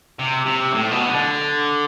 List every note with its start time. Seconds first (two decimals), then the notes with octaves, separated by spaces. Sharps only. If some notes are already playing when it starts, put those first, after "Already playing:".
0.19 C3
0.46 C3
0.74 A2
0.91 B2
1.09 D3